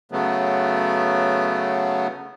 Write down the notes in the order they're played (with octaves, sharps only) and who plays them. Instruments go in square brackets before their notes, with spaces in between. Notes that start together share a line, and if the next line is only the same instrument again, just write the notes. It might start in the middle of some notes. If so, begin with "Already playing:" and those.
[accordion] C#3 F#3 A3 B3